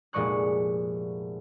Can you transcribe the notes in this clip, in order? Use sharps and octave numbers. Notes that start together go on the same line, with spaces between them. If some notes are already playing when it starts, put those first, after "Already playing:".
F1 A#2 G#3 D5 C#6 F#6